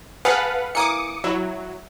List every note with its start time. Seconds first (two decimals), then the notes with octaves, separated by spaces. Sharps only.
0.25 G#4 A4 B4 F5 F#5
0.75 E3 A#3 D6 D#6 C#7
1.24 F#3 E4